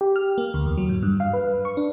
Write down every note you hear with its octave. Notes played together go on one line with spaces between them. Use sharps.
G4
F6
A#3
D2
E2
F#3
G#2
G2
F5
B4
C#6
D4